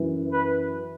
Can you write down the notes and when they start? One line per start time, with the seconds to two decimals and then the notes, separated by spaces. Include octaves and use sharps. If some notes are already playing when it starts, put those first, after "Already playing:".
Already playing: F#2 E3
0.31 B4